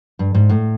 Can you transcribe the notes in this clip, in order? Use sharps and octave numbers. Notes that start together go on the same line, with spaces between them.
G2
G#2
A2